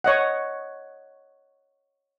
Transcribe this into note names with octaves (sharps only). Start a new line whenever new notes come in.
C#5 D#5 F#5